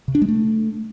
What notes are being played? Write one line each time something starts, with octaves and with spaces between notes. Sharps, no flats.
C3
D4
G#3
A3